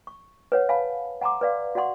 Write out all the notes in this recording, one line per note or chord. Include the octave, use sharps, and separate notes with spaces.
C#6
B4 C#5 F#5
C#5 F5 G#5 A5 B5
F#5 G#5 A#5 C6 D6
B4 D5 F5
F#4 D5 F5 F#5 C6 C#6